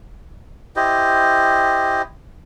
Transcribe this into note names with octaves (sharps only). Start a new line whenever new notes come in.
E4 G4 C5 D#5